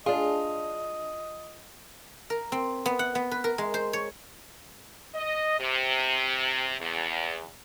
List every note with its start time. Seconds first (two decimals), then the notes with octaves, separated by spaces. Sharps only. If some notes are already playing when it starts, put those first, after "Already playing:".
0.06 D4 F4 G#4 D#5
2.30 A#4
2.52 C4
2.86 B3
2.99 F#5
3.15 B3
3.31 B4
3.44 A#4
3.58 G#3
3.74 C5
3.93 C#5
5.14 D#5
5.60 C3
6.80 E2